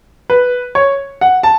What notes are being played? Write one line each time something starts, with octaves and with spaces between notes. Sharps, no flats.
B4
C#5
F#5
A5